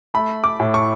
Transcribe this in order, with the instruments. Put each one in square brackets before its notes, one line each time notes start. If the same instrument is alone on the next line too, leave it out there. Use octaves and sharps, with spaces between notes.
[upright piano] A3 B5
D6
A2
C#6